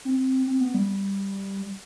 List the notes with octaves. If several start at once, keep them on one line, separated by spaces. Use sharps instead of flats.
C4
C4
B3
G3